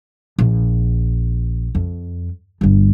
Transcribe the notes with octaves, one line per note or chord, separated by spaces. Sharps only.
A#1
F2
G1 G2